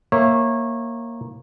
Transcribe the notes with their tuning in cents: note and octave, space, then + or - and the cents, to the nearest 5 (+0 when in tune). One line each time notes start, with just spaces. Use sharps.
A#3 +0 C#5 -25 E5 +0